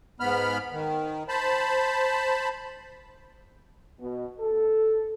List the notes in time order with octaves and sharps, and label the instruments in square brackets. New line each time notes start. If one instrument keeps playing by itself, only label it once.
[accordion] G#2 B3 B5 F6
D#3
C5 A5 B5
[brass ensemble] B2
A4